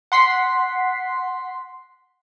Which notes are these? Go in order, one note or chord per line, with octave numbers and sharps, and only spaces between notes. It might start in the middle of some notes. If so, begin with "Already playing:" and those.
F#5 C6 B6 C7